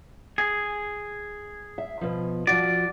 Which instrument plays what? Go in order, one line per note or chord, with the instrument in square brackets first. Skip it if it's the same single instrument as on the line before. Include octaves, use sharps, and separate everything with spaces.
[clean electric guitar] G#4
[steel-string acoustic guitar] E5
B2 F3
[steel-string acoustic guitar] F3 F#4 [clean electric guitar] D5